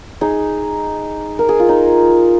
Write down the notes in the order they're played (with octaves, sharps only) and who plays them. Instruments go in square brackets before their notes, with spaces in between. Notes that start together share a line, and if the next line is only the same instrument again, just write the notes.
[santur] D#4 G#4
A#4
G#4
F4
D#4